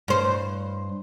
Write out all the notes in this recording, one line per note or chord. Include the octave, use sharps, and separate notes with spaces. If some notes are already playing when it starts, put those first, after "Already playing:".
G2 C5